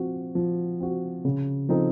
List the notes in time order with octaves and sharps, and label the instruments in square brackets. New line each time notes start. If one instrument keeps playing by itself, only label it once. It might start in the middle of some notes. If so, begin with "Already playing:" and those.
Already playing: [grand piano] F3 C4 F#4
F3
C4 F#4
C#3
F3 C4 D#4 A4